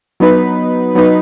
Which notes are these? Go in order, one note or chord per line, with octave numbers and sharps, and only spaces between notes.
F#3 B3 D#4 B4
F#3 B3 D#4 B4